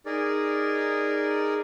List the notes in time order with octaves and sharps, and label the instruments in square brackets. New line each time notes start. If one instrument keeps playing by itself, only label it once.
[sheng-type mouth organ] D#4 G#4 A#4 D5